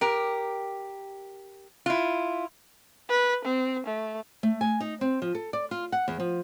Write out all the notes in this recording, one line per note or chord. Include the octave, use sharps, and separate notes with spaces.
G4 A#4
E4 F4
B4
C4
A3
A3
G#5
D#4
C4
F3
A4
D5
F4
F#5
E2
F3